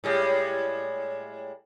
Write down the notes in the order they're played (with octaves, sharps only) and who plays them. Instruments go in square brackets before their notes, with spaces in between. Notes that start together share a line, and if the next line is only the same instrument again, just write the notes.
[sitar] A2 G3 G#3